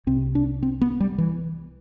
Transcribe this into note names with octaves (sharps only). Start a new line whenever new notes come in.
C2 C3 C4
D4
C4
B3
G3
E3